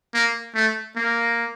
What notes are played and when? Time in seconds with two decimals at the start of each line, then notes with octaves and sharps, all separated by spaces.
0.14 A#3
0.55 A3
0.96 A#3